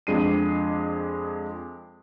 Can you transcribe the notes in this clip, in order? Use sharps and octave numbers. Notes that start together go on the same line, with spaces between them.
F2 G#3 D4 C7 D#7